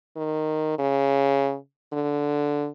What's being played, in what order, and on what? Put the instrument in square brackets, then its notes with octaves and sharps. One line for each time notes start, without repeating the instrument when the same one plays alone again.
[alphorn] D#3
C#3
D3